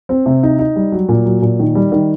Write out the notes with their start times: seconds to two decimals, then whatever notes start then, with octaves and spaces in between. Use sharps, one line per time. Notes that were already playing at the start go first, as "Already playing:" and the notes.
0.09 C4
0.26 C3
0.43 D#4
0.59 D#4
0.76 G3
0.92 F#3
1.09 A#2
1.26 F#3
1.42 A#2
1.59 D#3
1.75 G3
1.92 D#3